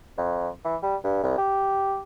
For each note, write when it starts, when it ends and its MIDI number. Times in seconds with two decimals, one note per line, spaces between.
0.18 0.49 41
0.65 0.76 52
0.83 0.96 55
1.04 1.21 43
1.23 1.37 36
1.38 2.01 67